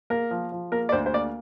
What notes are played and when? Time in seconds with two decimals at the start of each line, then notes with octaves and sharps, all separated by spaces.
0.10 A#3 A#4
0.31 F3
0.52 F3
0.72 A#3 A#4
0.89 D5
0.92 D2 C5
1.06 C5
1.14 A#3 D5